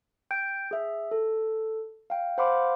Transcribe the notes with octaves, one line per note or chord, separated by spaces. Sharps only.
G5 G6 D7
G#4 E5
A4
F5 G5
C5 F5 F#5 B5 C6 D6